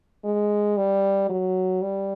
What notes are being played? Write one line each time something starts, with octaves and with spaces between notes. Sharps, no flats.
G#3
G3
F#3
G3